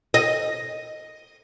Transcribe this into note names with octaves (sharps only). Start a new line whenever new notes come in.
D#5